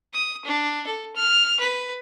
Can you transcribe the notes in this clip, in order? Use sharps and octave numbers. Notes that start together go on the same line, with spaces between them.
D#6
D4
A4
F6
B4